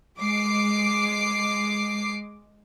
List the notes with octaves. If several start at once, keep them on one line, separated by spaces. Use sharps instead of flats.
G#3 D6 C7